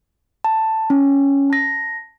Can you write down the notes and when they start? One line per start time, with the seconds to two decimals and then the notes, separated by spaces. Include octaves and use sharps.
0.44 A5
0.90 C#4
1.50 A5 A#6